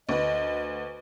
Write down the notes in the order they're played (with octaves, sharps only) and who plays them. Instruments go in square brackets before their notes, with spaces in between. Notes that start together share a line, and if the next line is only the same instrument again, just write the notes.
[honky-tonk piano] D2 B4 [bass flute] D#5